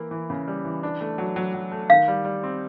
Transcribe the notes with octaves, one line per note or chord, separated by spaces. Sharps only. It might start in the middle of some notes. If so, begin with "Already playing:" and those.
Already playing: E3 A#3 E4
E3
C#3
G3
E3
D4
A3
F#3
F#3
F#3
A3
D#3 F5
G3
G3
C4